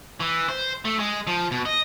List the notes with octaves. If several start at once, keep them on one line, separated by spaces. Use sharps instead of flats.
E3
C5
A3
G#3
F3
B2
D#5